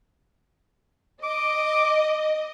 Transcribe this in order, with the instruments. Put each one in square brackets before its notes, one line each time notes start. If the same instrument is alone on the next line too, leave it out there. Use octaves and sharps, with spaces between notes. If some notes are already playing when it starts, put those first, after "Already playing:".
[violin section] D#5 [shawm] D6